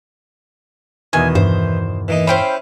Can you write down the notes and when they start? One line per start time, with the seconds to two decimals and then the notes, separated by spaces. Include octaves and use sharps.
1.13 E2 B2 D#3 E3 G#5
1.35 G2 C5
2.08 E3 A#3 D#4
2.27 C#4 E4 C5 F5 G5 B5